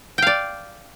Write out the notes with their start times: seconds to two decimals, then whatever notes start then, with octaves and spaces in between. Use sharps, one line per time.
0.18 G5
0.22 F5
0.27 D5